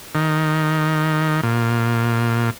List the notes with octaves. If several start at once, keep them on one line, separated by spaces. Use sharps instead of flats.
D#3
A#2